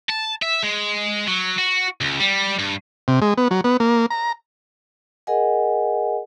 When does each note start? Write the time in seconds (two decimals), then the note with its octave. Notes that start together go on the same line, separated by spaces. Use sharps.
0.10 A5
0.42 E5
0.63 G#3
1.27 F#3
1.58 F#4
2.01 C#2
2.20 G3
2.59 G2
3.08 C3
3.22 G#3
3.38 B3
3.51 F#3
3.64 B3
3.80 A#3
4.10 A#5
5.27 G#4 A#4 D#5 F#5 G#5